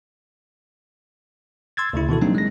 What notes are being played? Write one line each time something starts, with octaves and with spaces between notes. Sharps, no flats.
C6 E6 G#6 A6
D2 C#3 E4
B2 D#3 E3 E4 F#4 A4
F#3 G3 A#3 C4 D4 D#4
G#3 A#6